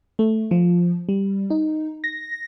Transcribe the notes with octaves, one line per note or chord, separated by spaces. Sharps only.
A3
F3
G3
D#4
A#6